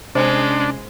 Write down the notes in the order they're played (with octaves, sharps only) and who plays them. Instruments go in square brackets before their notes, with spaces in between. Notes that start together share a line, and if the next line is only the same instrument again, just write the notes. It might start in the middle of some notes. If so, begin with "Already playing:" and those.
[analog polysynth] C3 C#4 [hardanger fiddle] G#3 G#4 [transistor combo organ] D4 [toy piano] C5 B5